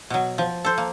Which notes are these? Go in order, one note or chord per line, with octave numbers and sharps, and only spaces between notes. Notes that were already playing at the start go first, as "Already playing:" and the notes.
B2 F#3
F3
A4 C5
A#3